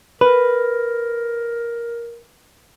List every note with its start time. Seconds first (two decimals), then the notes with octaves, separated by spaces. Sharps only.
0.21 A#4 B4